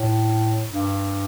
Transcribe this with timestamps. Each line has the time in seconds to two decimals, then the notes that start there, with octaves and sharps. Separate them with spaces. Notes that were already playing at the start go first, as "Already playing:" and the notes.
Already playing: A2
0.71 G2